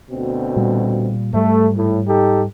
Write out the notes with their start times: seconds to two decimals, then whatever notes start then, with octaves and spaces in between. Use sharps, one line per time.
0.11 D2 B2 C4
0.56 A#2 G3
1.33 G#2 G3 A3
1.77 A2
2.07 D#4 G4 A4